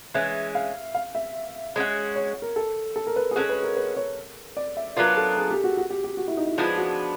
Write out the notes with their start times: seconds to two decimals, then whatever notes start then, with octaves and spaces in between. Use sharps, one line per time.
0.14 E3 G#3 C#4 E5
0.55 F5
0.95 F5
1.15 E5
1.76 G#3 C#4 F#4
2.16 C#5
2.42 A#4
2.56 A4
2.96 A4
3.07 A#4
3.16 B4
3.31 G#4
3.36 G#3 C#4 F#4 A4
3.49 B4
3.63 A#4
3.76 B4
3.97 C#5
4.57 D5
4.77 E5
4.96 F#3 B3 D4 F4 A#4
5.17 A4
5.37 G#4
5.50 G4
5.64 F#4
5.77 F#4
5.90 G4
6.04 G4
6.17 F#4
6.28 E4
6.37 D#4
6.47 E4
6.57 F3 G#3 B3 D4 F4
6.78 F#4